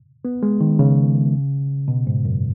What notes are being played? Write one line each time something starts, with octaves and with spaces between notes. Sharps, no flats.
B3
G#3
D#3
C#3
B2
G#2
F#2